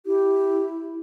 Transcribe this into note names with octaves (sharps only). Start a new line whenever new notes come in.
E4 G4